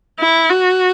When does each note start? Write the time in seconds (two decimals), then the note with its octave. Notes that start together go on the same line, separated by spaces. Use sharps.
0.20 E4
0.50 F#4